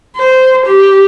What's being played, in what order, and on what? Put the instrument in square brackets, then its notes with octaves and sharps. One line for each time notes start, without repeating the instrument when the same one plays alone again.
[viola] C5
G4